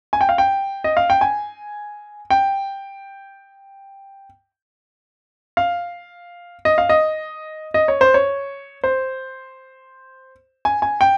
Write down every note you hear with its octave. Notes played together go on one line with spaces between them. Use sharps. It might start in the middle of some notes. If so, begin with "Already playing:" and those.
G#5
G5
F5
G5
D#5
F5
G5
G#5
G5
F5
D#5
F5
D#5
D#5
C#5
C5
C#5
C5
G#5
G#5
G5